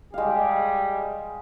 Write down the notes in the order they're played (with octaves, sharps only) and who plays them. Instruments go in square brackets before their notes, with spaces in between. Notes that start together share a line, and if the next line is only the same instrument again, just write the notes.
[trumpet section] G3 G4 G#4 [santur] G#3 F5